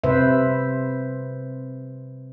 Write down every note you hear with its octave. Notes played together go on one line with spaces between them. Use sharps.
C3 B4 C5 E5